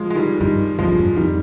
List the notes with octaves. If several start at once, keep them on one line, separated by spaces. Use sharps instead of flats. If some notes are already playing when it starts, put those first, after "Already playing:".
Already playing: F3 G#3
G#3
D#3 G3
G2 D#3 G3
F2 F3 G#3
G2
F2
F2 D#3 G3